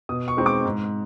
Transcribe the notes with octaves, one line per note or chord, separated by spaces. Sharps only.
B2 D#6
C#6
G#3 C4 D#4
D6
G#2